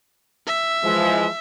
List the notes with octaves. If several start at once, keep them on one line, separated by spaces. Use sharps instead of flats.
E5
E3 F3 G#3